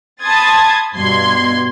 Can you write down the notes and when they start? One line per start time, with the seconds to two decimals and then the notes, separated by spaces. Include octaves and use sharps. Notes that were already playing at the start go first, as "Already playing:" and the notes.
0.23 A5 B5 C6 D#6 G#6 A6
0.96 G2 B2 C6 G#6